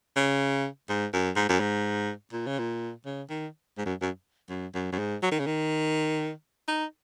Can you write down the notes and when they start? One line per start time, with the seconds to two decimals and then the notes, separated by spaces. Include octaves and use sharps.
0.16 C#3
0.89 G#2
1.13 F#2
1.36 G#2
1.49 F#2
1.60 G#2
2.33 A#2
2.47 C#3
2.59 A#2
3.06 C#3
3.29 D#3
3.78 G#2
3.86 F#2
4.02 F#2
4.50 F#2
4.74 F#2
4.92 F#2
4.99 G#2
5.22 F#3
5.31 D#3
5.39 C#3
5.46 D#3
6.68 D#4